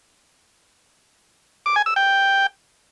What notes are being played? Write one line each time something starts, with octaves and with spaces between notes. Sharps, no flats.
D6
G#5
E6
G5